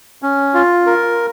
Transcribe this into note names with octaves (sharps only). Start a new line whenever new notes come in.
C#4
F4
A#4